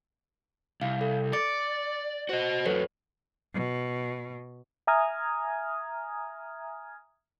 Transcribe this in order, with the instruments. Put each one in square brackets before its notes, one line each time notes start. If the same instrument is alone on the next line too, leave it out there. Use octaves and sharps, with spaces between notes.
[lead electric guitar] C2 [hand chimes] F5
[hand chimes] A4
[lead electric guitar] D5 [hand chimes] D6 A6 C#7
[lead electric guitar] F#4 D#5 [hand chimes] C5
[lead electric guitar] E2 F#3 [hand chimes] A4 B4 C#5
[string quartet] B2
[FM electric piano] E5 G#5 A#5 D#6 F6 G#6